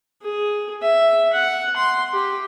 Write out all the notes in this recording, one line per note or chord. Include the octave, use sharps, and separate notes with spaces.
G#4
E5
F#5
C6
G4